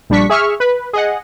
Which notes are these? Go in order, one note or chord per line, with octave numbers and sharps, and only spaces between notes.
A#1 G3 D4 C#6 B6
G#4 E5 C#6 F6
B4
G#4 D#5 F#5